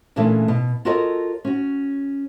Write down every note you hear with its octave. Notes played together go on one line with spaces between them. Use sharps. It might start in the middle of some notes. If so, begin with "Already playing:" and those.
A#2 C#3 E3 A3 A#3 D4
B2
F4 F#4 A4 A#4 C#5 D#5
C#4 F#4